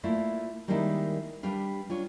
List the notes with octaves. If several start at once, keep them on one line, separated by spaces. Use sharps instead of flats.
A3 A#3 E4 F4 D5
D#3 G3 G#3 A#3 D#4 E4
G3 D4 G4 B4 F5
D4 F4 C#5